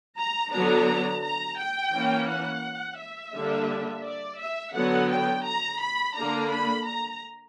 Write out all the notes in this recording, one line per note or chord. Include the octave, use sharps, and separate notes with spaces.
A#5
D3 F#3 B3 D4 A#5
A#5
G5
E3 A#3 C#4
F#5
E5
D3 G3 A#3 D4
D5
E5
D3 F#3 B3 F#5
G5
A#5
B5
D3 A#3 D4 A#5
B5
A#5